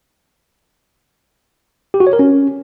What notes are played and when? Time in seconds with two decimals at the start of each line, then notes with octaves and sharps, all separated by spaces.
1.94 G4
2.00 F#4
2.07 C#5
2.13 A#4
2.19 C#4